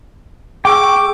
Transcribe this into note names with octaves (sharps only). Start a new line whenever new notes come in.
G#4 G5 C#6 D6 E6